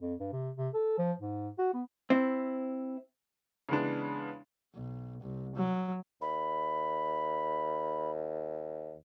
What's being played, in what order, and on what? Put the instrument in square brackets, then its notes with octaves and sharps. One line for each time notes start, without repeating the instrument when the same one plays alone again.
[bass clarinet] F2
G2
C3
C3
A4
F3
G#2
F#4
B3
[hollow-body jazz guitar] C4 E4
[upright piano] C#3 E3 G#3 B3 D4
[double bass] B1
C2
F#3
[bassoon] D#2 [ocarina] B5